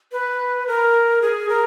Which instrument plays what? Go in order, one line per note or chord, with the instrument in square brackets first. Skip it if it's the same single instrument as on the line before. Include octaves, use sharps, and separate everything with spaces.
[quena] B4
A#4
G#4
A#4